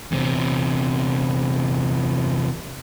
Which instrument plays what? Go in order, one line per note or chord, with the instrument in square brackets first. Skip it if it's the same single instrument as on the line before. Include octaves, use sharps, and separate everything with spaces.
[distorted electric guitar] E2 C3